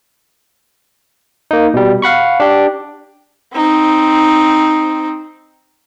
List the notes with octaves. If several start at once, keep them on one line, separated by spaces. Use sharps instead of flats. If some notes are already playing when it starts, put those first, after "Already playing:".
A#3 D#4
B2 G3
F5 F#5 B5 C#6
D4 G4
C4 D#4